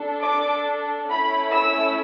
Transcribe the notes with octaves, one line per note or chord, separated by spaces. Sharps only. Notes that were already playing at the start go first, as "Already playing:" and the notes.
Already playing: D4 A4
D6
A3 C#4 E4 B5
E6